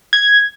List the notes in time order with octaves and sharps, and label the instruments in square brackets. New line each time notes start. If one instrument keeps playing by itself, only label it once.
[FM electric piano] G#6